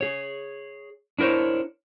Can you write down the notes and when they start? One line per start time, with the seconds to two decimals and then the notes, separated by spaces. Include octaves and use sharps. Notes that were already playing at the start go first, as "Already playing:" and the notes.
0.01 G#4 C#5
1.19 D4 E4 A#4 C5 C#5